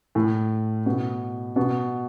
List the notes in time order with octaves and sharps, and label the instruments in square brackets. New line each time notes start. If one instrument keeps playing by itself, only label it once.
[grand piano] A2
B2
B2